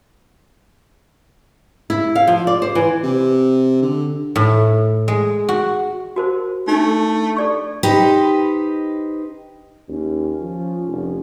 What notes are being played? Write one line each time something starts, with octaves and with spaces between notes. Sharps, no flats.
E4
F5
F3
D5
C5
E3
C3
D3
A2
G#3
F#4
F#4 A#4 C5
A3 D4 D#4
A4 D5 C#6
D#4 G4 B4 C5
D#2 C#4
F3
F1